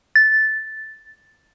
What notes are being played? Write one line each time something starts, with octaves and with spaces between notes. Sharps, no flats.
A6